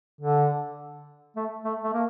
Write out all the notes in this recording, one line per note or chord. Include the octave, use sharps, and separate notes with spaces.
D3
A3
A3
A3
A#3